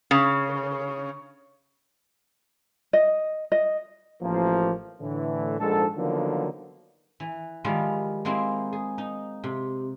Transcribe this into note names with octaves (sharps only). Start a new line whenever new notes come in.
C#3
D#5
D#5
A1 F3 A#3
A2 D3 E3
A#1 G#2 A4
D3 D#3 F3 F#3 A#3 B3
E3
D#3 F3 G3 G#3 E4
G#3 A#3 C4 D#4 E4
G#4
D#4
C3